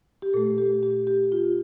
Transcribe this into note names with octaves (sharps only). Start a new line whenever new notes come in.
G4
A#2 A3 A4
G4
G4
G4
F4